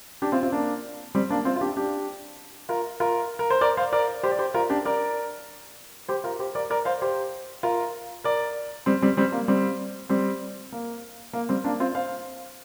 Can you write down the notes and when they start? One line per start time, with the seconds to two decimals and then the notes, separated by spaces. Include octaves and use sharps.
0.22 D4 G4
0.32 C4 F4
0.43 C4 F4
0.52 A#3 D4
1.15 G3 C4
1.30 A#3 D4
1.45 C4 F4
1.56 F4
1.61 D4 G4
1.76 D4 G4
2.69 F4 A#4
3.00 F4 A#4
3.39 A#4
3.50 C5
3.61 A#4 D5
3.77 C5 F5
3.92 A#4 D5
4.23 G4 C5
4.32 D5
4.39 G4 C5
4.54 F4 A#4
4.70 D4 G4
4.85 A#4 D5
6.08 G4 C5
6.24 F4 A#4
6.39 G4 C5
6.55 A#4 D5
6.70 A#4 D5
6.85 C5 F5
7.02 G4 C5
7.63 F4 A#4
8.24 A#4 D5
8.86 G3 C4
9.02 G3 C4
9.17 G3 C4
9.32 A#3
9.48 G3 C4
10.09 G3 C4
10.72 A#3
11.33 A#3
11.49 G3 C4
11.64 A#3 D4
11.80 C4 F4
11.95 C5 F5